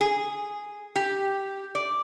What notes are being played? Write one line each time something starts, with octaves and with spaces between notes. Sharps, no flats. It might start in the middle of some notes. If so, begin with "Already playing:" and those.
G#4
G4
D5